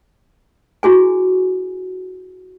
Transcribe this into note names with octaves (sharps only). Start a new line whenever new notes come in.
E4 F#4 G#4 G#5